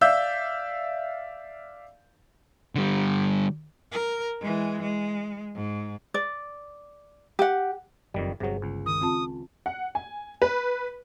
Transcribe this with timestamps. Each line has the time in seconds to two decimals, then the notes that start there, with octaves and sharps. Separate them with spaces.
0.01 D5 E5 F5 E6 G6
2.75 D3 G3
3.92 A#4
4.40 E3 G#3
4.82 G#3
5.55 G#2
6.14 D5
7.39 G4 F#5
8.14 F#1 F2 D#3 G3
8.40 G1 C3 F#3 G#4 C5
8.62 C#2
8.86 D#3 D#6
9.01 C4 F4 A5
9.66 F#5
9.95 G#5
10.42 B4